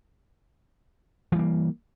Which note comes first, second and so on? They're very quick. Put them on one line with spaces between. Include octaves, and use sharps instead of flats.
E3 G3 A#3